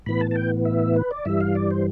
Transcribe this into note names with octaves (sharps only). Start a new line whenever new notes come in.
A2 E3 B3 B5
A5
A5
G5
E5
B4
D5
G2 E3 G3 E5
F5
D5
C5